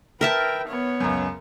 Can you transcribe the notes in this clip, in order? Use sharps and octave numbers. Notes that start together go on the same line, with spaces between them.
A#4 B4 E5 G5 A5
B3 C#5
C#2 F#2